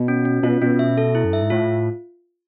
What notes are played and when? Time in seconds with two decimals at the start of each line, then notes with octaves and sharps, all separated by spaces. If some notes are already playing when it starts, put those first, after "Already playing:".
Already playing: B2
0.08 C#4
0.25 C#4
0.43 B2 F4
0.61 B2 C#4
0.79 E5
0.98 A4
1.15 E4
1.24 F#2
1.33 G2 E5
1.42 G#2
1.50 A2 F4